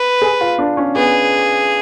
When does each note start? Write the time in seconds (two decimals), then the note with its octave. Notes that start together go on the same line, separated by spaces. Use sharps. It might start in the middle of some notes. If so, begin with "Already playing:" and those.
Already playing: B4
0.22 G#4
0.41 F4
0.59 D4
0.77 C#4
0.96 B3 G#4